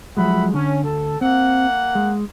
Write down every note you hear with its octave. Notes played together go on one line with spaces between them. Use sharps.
F3 F#3 G#3 E5 F#5 B5
D3 C#4
D2 A4
A#3 C4 F#5
G#3